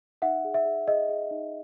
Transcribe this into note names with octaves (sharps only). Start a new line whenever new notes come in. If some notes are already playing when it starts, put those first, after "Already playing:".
D#4 E5 F#5
G#4
E5
G#4
G#4 D#5
G#4
D#4